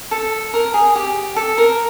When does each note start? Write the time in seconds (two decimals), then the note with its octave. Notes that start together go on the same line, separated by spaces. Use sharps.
0.11 A4
0.54 A#4
0.74 G#4
0.96 G4
1.36 A4
1.58 A#4